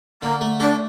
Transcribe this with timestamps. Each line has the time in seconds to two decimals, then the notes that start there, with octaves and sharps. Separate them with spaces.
0.22 D3 A#3
0.41 A3
0.60 D4 A4